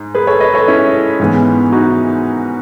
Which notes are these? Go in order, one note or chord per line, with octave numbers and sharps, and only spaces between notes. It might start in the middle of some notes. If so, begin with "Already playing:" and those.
Already playing: G#2
G#4 B4
A4 C#5
B4 D#5
A4 C#5
C#4 E4
G#2 E3 G#3 B3
D#4 F#4